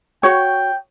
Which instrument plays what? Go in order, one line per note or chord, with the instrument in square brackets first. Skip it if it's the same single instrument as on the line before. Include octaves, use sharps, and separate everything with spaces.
[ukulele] F#4 C#5 [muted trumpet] G5